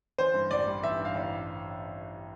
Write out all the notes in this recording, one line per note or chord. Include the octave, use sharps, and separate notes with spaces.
E3 C5
G2
A1 D5
G3
E3 E5
G2
F5
A1